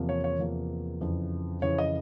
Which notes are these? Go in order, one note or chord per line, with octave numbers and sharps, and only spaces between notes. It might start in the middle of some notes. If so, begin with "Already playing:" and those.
Already playing: E2 C3 F3 A#3
C#5
C#5
E2 C3 F3 A#3
F2 C#3 E3
F2 C#3 E3 C#5
D#5